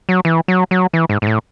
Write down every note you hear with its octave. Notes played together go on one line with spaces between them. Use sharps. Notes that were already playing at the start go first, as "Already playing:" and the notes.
F#3
E3
F#3
F#3
E3
G#2
G#2
A2